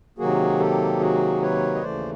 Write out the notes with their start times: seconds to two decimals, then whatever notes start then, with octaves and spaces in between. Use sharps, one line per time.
0.18 C3 D#3 F#3 A#3 F#4 G#4
0.59 G4 A4
1.00 F#4 G#4
1.41 B4 C#5
1.75 D#5
1.82 D#2 C#3 E3 A3 C5 D5